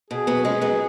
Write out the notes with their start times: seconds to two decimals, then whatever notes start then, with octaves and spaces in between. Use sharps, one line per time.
0.10 B2 G#4
0.27 F#3 B3
0.45 G#3 C#4
0.61 F#3 B3